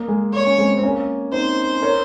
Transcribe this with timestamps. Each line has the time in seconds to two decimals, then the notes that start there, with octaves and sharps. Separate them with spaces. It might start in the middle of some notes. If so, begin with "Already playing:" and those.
Already playing: A#3
0.08 G#3
0.33 A#3 C#5
0.46 C#4
0.58 G#3 C4
0.78 C4
0.83 A#3 C#4
1.32 C4 D#4 C5
1.82 A#4 C#5